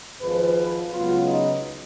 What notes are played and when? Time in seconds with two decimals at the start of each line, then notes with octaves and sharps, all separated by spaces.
0.21 G#1 G#2 F3 B4
0.91 C#2 C#3 F#3 B3 F4
1.27 D#4